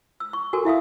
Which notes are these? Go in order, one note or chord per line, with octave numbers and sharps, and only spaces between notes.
E6
C#6
F#4 A4 A#4 G#5
E4 E5 F5 D#6